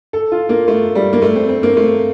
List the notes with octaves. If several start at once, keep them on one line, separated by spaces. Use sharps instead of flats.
A4
F4
A#3
A3
G3
A#3
A3
C4
C4
A#3
A3